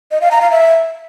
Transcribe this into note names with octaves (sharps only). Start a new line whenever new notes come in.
D#5
F5
A#5
F5
E5